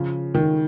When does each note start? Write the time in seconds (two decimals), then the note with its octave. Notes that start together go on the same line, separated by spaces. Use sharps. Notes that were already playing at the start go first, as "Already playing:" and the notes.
Already playing: C#3 F3
0.35 D#3